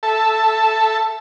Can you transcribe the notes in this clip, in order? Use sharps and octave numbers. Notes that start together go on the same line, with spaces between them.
A4 E5 A5